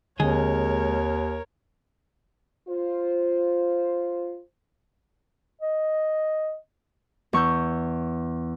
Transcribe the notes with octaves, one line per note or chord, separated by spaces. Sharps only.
D#2 D3 G#3 C4 G#4 A#4 C#5
F4 C5
D#5
E2 C#6 E6 G6